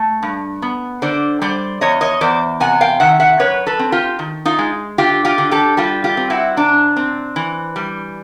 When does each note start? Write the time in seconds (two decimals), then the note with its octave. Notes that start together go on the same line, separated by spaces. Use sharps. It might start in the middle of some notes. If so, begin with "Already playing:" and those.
Already playing: A3
0.23 G2
0.62 B3
1.02 D3 C5 D5
1.42 G3 C5 D5
1.81 E2 C#5 D#5
2.01 C#5 D#5
2.21 E2 C5 D5
2.60 C3 F#5 G#5
2.81 F5 G5
3.00 D#3 E5 F#5
3.20 E5 F#5
3.39 F#2 B4 C#5
3.67 A4 B4
3.79 C4
3.92 F4 G4
4.19 D#3
4.45 D#4 F4
4.59 G#3
4.98 D3 F4 G4
5.25 F4 G4
5.38 D3
5.51 G4 A4
5.77 G3 F4 G4
6.04 F4 G4
6.17 C4
6.30 E4 F#4
6.57 C3 D4
6.96 C4
7.36 E3
7.76 G3